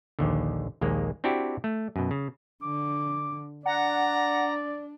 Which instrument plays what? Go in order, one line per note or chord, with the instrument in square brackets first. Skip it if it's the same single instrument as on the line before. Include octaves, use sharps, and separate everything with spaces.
[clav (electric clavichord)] A#1 D#2 D3
A#1 D#2 G#3 A#3
C4 D4 E4 F#4 G4
A3
F#2 B2
C#3
[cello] D3 [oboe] D6
[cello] D4 [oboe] D5 [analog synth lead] F#5 [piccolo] A#5